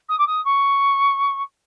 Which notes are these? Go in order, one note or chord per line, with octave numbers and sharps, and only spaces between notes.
D#6
D6
D#6
C#6